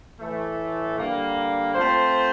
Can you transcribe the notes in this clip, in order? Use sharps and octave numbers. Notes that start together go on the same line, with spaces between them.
A2 E3 A3
D3 G3 A#3
A3 C4 F4 C5